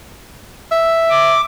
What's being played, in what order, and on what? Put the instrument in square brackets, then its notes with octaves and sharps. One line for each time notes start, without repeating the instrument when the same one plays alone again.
[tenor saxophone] E5
[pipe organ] D6